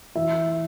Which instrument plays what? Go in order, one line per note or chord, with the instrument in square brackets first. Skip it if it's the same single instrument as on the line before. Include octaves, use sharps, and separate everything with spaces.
[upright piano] E3 E5